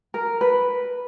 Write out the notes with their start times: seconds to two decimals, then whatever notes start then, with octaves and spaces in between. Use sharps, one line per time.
0.14 A#4
0.41 B4